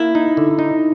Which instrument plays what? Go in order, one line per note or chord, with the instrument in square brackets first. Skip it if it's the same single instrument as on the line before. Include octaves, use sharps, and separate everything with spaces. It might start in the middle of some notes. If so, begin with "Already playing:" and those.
Already playing: [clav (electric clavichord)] A#3 [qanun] E4
[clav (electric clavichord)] D#4
D3
D#4